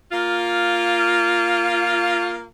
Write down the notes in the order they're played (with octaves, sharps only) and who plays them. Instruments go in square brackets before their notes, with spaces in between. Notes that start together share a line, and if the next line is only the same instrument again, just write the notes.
[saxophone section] A#3 F4